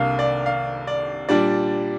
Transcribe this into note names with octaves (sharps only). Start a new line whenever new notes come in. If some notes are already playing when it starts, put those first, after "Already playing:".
Already playing: C2 C3 A#3 D4 F5
D5
F5
D5
A#2 G3 D4 D5